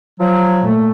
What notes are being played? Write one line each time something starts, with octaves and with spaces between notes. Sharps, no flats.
F3 F#3
A#2 A3